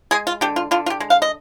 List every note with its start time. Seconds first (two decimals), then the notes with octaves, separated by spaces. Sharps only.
0.11 G#3 G#4
0.27 F4
0.41 D3 G4
0.56 F4
0.71 D3 F4
0.86 F4
0.90 G4
1.00 G#3
1.10 F5
1.22 D#5